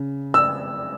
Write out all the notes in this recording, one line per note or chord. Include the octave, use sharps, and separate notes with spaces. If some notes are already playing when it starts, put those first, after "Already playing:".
Already playing: C#3
E6